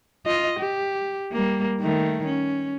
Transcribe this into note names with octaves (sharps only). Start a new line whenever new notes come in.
F4 D#5
G4
G3 A#3
D#3 A3
C#4